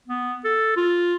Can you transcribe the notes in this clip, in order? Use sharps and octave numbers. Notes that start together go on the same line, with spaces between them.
B3
A4
F4